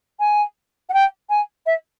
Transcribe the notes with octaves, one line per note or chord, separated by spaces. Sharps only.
G#5
F#5
G5
G#5
E5